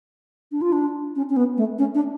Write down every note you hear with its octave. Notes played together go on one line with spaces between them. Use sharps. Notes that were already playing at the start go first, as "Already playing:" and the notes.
D4
F4
D4
C#4
C#4
B3
A3
C#4
D4